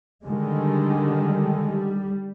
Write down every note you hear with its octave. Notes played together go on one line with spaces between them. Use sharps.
D3 D#3 G3 G#3
G3